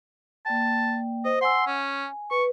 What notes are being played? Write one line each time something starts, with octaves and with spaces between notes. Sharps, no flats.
A#3 D5 G5 A5
C5 D#5
F#5 G#5 C6 E6
C#4 G#5
B4 C#6